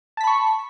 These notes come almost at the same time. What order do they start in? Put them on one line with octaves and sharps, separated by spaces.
A5 B6 B5 C#6